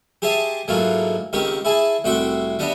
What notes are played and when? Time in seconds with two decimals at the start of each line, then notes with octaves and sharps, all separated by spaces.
0.22 G4 G#4 C5 E5 A5 D#6
0.68 G#2 E3 F#3 A3 A#3 F4
1.33 C#2 D#3 C4 G4 A#4 C#6
1.65 E4 G#4 A5
2.04 C2 A2 F#4 E5 G5 C6
2.59 G3 B3 D4 D#5 E5